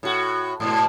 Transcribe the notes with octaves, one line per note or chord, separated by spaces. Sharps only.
A2 F#4
G#2 B2